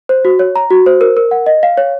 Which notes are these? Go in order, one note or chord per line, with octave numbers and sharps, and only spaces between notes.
C5
F#4
C#5
A#5
F#4
C5
A#4
A#4
F#5
D#5
F5
C#5